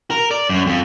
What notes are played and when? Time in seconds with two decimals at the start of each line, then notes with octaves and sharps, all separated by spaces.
0.11 A#4
0.31 D5
0.49 F#2
0.66 F2